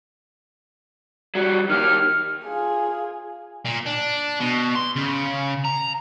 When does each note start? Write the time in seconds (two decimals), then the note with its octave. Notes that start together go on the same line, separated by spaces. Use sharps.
1.35 F#3 G3
1.70 D#3 G4 F6
2.46 F4 G#4
3.65 A#2
3.86 D4
4.40 B2
4.75 C6
4.96 C#3
5.65 A#5